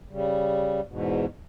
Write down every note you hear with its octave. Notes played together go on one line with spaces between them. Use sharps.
C#3 G3
E2 G#2 B2